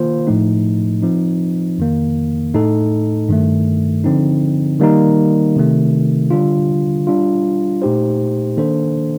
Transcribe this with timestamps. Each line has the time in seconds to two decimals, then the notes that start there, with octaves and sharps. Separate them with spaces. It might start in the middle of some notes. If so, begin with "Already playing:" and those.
Already playing: D#3 A#3 F4 C5
0.27 A2 F3 A3 D#4
1.02 F3 C4 D#4
1.78 F2 D#3 A#3
2.54 A2 A3 D#4 A4
3.29 G2 D#3 A3
4.04 D3 F3 C4 D#4
4.80 D#3 G3 A#3 D#4 A#4
5.56 C3 D#3 A3
6.31 D3 G3 D4 F4
7.07 G3 D4 F4
7.82 A#2 A3 D#4 G4 C5
8.57 D#3 A#3 D4 A4 C5